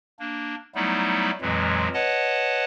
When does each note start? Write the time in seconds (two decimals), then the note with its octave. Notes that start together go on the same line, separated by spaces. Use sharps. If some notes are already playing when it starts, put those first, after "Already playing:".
0.19 A#3 D4
0.75 F#3 G3 A3 B3 D#4 E4
1.41 F2 A#2 E3 F#3 G#3
1.94 B4 C#5 D#5 F#5 A5